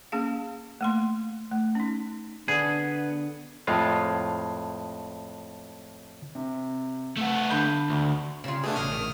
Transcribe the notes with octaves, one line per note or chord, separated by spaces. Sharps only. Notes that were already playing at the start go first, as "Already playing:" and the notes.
A#3 C#4 G#4 F5
A3 A#3 C6
A3
C#4 D#4
D3 B3 D4 G#4
F2 A2 G#3 F4
C3
A3 B3
D3 B5 G6
D2
C#3 G3 F4
B2 A3 D4 G#4
A1 C#3 D#6 F6
D#3